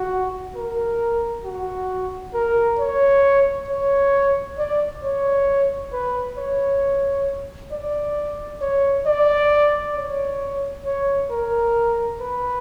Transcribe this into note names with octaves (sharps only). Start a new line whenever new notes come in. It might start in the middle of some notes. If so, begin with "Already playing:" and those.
Already playing: F#4
A#4
F#4
A#4
C#5
C#5
D5
C#5
B4
C#5
D5
C#5
D5
C#5
C#5
A#4
B4